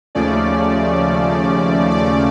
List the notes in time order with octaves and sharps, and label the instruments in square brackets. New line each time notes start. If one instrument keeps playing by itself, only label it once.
[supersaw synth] D#2 C#3 F3 A3 C#4 D5
D5